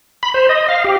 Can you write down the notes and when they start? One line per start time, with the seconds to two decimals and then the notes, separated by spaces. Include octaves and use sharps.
0.23 B5
0.34 C5
0.49 D#5
0.69 F5
0.84 G4